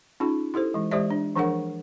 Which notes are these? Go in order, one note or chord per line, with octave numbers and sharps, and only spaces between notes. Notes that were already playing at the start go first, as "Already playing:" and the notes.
C#4 D#4 F4 G#4
E4 G4 A4 C5
E3 G#3
E3 G#3 G4 C5 D5 E5
D4
E3 F3 D4 G#4 A#4 F#5